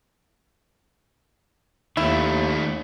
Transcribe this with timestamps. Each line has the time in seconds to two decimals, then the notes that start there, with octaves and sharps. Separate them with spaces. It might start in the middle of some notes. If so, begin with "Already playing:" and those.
1.97 D#2 D#3 A3 E4